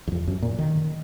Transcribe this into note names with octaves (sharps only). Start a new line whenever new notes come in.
E2
F2
F#2
A#2
D#3